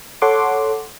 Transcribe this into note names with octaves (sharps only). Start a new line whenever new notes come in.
A4 C#5 F#5 C6 D6